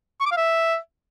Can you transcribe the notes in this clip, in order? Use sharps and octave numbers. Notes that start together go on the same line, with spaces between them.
C#6
D6
F5
E5